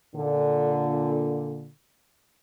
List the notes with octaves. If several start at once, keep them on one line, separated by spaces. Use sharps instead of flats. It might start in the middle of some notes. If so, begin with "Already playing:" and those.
A#2 D3